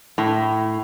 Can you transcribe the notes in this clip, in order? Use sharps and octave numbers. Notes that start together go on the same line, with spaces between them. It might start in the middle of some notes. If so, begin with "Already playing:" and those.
A2